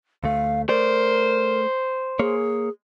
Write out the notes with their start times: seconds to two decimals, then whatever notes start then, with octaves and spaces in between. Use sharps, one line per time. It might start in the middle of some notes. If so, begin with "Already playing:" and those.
0.24 D2 A3 F5
0.69 A3 A#4 C5 D5
2.19 A#3 G#4 C#5